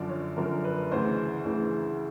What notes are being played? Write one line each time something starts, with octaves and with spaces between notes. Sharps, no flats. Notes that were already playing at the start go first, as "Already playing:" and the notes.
Already playing: F#2 D3 F3 D5
C#5
F#2 D3 F3 A#4
B4
D2 C#3 E3 C5
D2 C#3 E3